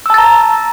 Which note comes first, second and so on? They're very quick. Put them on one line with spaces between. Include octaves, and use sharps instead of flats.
E6 A5 A6 A#5